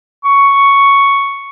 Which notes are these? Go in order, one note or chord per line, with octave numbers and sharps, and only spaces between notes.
C#6